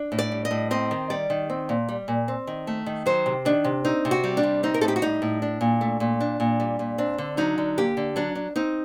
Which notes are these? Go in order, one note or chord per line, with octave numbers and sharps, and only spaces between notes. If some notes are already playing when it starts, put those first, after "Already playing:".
Already playing: D4
A2
D5
G3
D#5
A2
C4 D#5
D#3
G3 D5
D#3
C4
A#2
G3
A#2
C4
D#3
A3
D#3
F#3 C5
C3
D#3 D4
C3
C4 D#4
C3
F#4
G3
D4
C3
C4 D#4
A#4
A2 A4
G4
F#4
G3 D#4
A2
D4
A#2
A3
A#2
D4
A#2
G3
A#2
C4 D4
D3
F#3 D#4
D3
A#3 G4
D3
F#3 D4
D4
C4 D#4